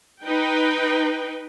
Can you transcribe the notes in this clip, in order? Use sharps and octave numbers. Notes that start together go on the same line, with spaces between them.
D#4 B4 G5